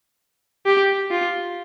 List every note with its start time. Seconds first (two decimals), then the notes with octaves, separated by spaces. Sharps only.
0.66 G4
1.11 F4